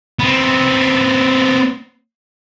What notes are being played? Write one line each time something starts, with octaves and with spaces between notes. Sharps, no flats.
B3 C4